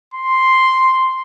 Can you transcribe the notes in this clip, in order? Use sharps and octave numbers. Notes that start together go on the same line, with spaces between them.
C6